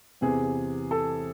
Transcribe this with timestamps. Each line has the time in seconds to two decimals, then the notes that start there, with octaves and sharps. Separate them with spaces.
0.21 E2 C3 E3 G#4
0.91 A4